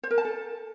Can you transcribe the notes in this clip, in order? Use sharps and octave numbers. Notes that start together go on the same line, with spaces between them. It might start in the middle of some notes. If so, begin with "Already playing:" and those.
C5
A#4
A5
A4